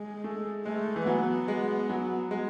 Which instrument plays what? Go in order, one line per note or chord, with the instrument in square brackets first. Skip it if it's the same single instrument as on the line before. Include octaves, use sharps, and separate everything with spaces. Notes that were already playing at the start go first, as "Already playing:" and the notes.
Already playing: [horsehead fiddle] G#3
[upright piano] A3
[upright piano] G#3 [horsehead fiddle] A3
[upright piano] E3
[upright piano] F#3 [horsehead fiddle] B3
[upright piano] G#3
F#3
G#3